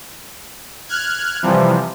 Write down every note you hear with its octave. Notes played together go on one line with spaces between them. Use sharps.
F6 F#6 G#6
C3 E3 F3 G3